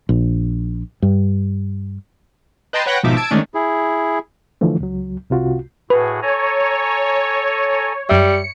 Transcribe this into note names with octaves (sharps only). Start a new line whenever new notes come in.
A#1
G2
B4 D#5 G5 A5 A#5 C6
B4 C#5 F#5 G5 F#6 A#6
G#1 B2 F3 D#4 E5 D6
A5 E6 G#6 D7
D3 D#3 G#3 A3 C#4 D4
E4 G#4
D3 E3 F3 A3
C#2 F#3
C2 C3 F4 F#4
A2 F#4 G#4 B4
A4 C#5 G#5 A#5
F#2 G3 E5 C#7